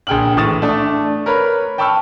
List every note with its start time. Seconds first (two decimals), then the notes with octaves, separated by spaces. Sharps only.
0.07 A#1 G#4 G5 F6 F#7
0.37 A2 E3 C#6 D#6 A6 E7
0.62 A3 D4
1.26 A#4 B4 C#5 B5
1.78 G5 A5 B5 C#6 E6 F6